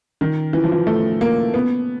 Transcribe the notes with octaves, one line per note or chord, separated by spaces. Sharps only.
D#3
E3
F3
E3
A3
A#3
B3